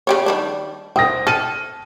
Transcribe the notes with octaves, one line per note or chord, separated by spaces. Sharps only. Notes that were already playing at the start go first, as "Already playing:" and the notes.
C#3 G4 C#5
D#3 G3 D4
C4 G5 D#6 A#6
A4 F6 D#7